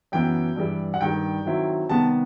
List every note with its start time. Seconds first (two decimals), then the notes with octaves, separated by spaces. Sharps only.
0.12 F#2 E3 B3 G5
0.56 G2 E3 G3
0.94 F#5
1.01 G2 D#3 G3 G5
1.45 D#3 F#3 C4 E4
1.89 C3 D#3 G3 B3 A5